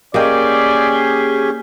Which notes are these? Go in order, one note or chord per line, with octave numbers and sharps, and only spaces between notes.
A#3 C#4 G4 G#4 D5 D#5 G5